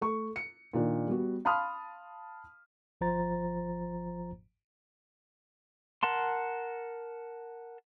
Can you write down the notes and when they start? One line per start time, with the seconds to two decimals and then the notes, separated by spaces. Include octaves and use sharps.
0.01 A3 C#6
0.36 C#7
0.73 A#2 D#3 D4
1.08 G3 B3 F#4
1.45 F5 A5 B5 C6 D#6 F6
3.01 G1 F3 F4 C5 A#5 A6
6.03 A#4 F#5 A5 C6